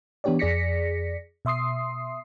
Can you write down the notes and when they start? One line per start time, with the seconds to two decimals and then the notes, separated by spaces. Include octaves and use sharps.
0.24 E3 B3 D4 G4 C#5 D5
0.39 F2 G#4 D5 A#6 B6 C#7
1.45 B2 E5 C6 D#6 C7